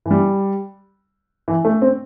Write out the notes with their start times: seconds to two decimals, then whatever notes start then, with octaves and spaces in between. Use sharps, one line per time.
0.06 E3
0.11 G3
1.48 E3
1.65 A3
1.82 C4